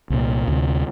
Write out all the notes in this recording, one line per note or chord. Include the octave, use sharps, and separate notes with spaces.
C2 A#2
D2 C3